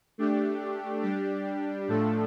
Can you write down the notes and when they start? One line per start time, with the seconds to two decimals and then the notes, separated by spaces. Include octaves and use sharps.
0.18 A3 D4 G4
1.02 G3 D4 G4
1.88 A2 F3 A3 D4 A4